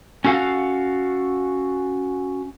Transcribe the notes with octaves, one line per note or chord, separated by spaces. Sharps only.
C#4 F#4 A4 F5 F#5